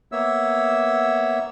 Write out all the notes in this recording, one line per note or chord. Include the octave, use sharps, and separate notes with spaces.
A#3 B3 C#5 E5 E6